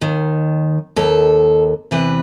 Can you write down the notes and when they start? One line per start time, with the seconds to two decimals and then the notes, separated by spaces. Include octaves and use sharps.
0.01 D#2 D#3
0.96 D#2 D#3 A4
1.91 E2 C3 E3 B4